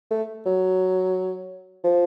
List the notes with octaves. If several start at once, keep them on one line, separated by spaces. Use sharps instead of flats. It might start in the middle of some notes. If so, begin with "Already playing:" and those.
A3
F#3
F3